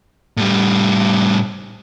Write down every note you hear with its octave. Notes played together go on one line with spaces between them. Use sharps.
A2 G3